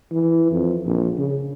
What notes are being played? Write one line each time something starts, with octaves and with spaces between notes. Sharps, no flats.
E3
F2
A#1
C#3